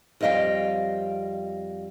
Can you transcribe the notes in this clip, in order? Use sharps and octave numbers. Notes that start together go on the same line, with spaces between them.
F2 G3 D#5 F5 G5